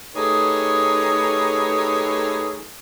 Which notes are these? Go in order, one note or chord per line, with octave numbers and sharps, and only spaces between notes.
A3 D#4 G4 G#4 B4 C#5